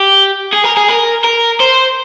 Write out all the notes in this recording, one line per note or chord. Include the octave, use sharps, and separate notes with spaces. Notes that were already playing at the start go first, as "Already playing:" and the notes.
Already playing: G4
G#4
A#4
G#4
A#4
A#4
C5